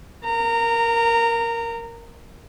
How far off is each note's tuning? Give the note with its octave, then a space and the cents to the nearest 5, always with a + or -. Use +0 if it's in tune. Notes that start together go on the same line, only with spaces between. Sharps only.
A#4 +0 A#5 -20